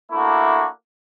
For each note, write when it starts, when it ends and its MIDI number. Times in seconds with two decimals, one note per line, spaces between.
0.12 0.67 57
0.12 0.67 58
0.12 0.67 62
0.12 0.67 64
0.12 0.67 66